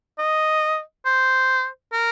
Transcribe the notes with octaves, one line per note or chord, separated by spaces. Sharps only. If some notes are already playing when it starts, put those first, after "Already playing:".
D#5
C5
A#4